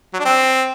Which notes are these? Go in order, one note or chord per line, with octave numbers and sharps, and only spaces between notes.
F#3
D4
C4